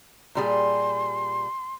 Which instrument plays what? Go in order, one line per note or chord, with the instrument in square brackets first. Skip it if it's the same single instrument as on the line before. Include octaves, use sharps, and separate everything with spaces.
[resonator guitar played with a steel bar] A#2 G3 G#4 [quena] C6